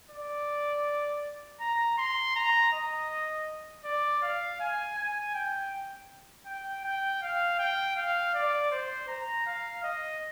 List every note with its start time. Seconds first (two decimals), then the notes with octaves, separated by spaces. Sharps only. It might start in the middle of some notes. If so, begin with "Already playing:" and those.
0.11 D5
1.61 A#5
1.98 C6
2.36 A#5
2.73 D#5
3.85 D5
4.22 F5
4.60 G#5
4.98 G#5
5.34 G5
6.46 G5
6.85 G5
7.22 F5
7.59 G5
7.96 F5
8.34 D5
8.71 C5
9.08 A#5
9.47 F5
9.84 D#5